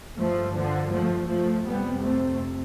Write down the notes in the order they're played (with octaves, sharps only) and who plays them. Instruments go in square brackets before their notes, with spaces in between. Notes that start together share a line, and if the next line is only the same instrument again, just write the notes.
[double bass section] G2 F3 A3
D3 F3
F3 A3
F3 A3
F2 C3 G3 B3
A3 C4